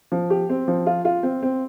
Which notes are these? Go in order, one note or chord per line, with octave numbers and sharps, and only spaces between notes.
F3
G4
C4
F3
F4
F4
C4
C4